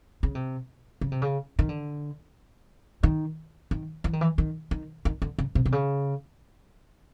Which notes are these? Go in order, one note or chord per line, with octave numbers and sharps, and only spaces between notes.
C#3
C3
C#3
C3
C#3
D#3
D3
D#3
D#3
E3
D#3
E3
D#3
D#3
D#3
D3
C#3
C3
C3
C#3